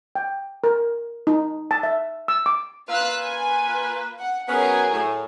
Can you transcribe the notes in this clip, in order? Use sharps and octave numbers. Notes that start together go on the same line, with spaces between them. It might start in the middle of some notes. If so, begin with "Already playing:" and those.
G5
A#4
D#4
A5
E5
E6
D6
A#3 F4 B4 F5 E6 F#6
G#5
F#5
F#3 B3 C#4 G#4 A#4
A2